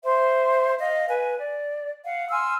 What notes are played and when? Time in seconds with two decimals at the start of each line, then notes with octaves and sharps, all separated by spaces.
0.04 C5 E5 C6
0.79 D#5 F5
1.08 B4 G#5
1.38 D5
2.04 F5 F#5
2.31 G#5 C6 E6 F6